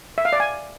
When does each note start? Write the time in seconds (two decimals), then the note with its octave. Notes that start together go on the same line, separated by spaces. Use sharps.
0.18 E5
0.25 F5
0.33 D5
0.40 G#5